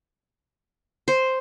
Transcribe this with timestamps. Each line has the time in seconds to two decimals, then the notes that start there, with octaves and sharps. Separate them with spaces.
1.08 C5